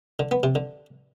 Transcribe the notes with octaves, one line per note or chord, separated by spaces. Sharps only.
D3
B3
C3
D3